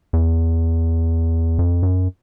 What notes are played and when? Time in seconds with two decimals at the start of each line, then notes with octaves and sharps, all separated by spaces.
0.13 E2
1.59 F2
1.83 F#2